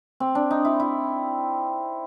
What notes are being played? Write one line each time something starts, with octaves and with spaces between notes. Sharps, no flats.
C4
D4
D#4
E4
E4